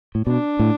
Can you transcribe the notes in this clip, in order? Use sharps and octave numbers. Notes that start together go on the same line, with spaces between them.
A2
B2 D4
A2